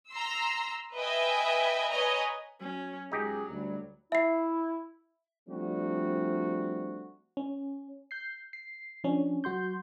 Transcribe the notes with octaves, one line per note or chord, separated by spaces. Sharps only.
A#5 C6 E6
B4 D#5 E5 G5 G#5
B4 C#5 D#5 G#5 A#5
F#3 C#4
C#2 F#3 D#4 G4 G#4
D2 G3
E4 E5 C7
F3 G3 A3 C4 D4 F#4
C#4
G6 C7
C7
F3 C#4 D4
F#3 F#4 C6 G6